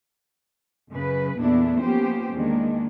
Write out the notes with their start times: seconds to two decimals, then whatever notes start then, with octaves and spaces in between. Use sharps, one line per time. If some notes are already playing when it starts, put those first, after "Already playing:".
0.91 F#2 C#3 B4
1.38 E2 A#2 A3 B3 D4 E4
1.80 F3 A#3 B3 C#4 G4 C5
2.34 E2 D#3 G#3 A#3 D4